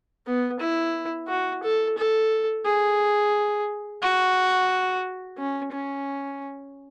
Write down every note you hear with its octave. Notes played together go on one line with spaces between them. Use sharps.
B3
E4
F#4
A4
A4
G#4
F#4
C#4
C#4